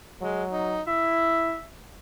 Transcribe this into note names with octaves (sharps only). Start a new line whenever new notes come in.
F#3 G#3
D#4
E4 E5